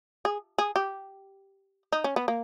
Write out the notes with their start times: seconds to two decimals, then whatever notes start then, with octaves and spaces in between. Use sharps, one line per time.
0.25 G#4
0.58 G#4
0.76 G4
1.92 D#4
2.04 C#4
2.16 B3
2.28 A#3